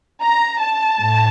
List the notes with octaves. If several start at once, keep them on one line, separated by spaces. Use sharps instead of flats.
A#5
A5
A2